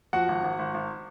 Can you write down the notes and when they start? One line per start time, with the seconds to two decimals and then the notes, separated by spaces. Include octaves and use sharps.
0.13 F3 F#4 F#5
0.28 G#1
0.44 G#1
0.59 G#1
0.74 G#1